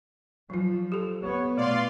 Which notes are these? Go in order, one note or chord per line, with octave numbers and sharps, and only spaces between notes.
F3 F#3 F4
G4 A4
B3 C#5
B2 A3 F4 D5 F5 C6